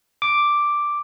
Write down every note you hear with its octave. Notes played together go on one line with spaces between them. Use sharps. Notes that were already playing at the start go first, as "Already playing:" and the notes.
D6